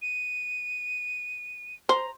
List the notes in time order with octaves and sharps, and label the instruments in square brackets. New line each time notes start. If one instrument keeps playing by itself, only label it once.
[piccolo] D#7
[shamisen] C5 [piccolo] A#5